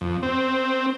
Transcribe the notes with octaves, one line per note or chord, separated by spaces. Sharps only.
F2
C4